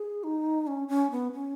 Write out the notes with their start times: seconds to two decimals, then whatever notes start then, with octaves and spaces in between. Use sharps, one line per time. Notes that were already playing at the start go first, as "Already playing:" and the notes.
Already playing: G#4
0.24 D#4
0.67 C#4
0.88 C#4
1.11 B3
1.33 C#4